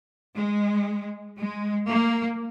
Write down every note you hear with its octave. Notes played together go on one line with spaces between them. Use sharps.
G#3
G#3
A#3